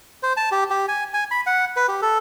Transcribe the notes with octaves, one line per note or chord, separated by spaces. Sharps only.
C5
A5
G4
G4
G#5
G#5
B5
F#5
B4
G4
A4